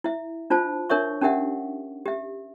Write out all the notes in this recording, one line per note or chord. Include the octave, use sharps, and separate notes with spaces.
E4 E5
D4 F4 C5 A5
D4 A#4 C#5 E5 C#6
C#4 D4 G4 A#4 E5 F#5
G4 E5